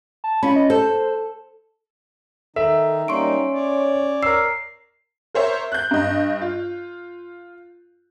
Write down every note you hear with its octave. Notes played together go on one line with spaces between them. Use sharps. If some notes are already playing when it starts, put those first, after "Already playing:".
A5
C#4 F4 B5
D#5
A4 C5
D#3 D#4 A4 E5
G3 A#3 C#4 D#4 C6 C#6 D7
C#5 D5
A#4 E6 C7
A#4 C5 C#5 E5
F#6 G6
G2 D#5
F4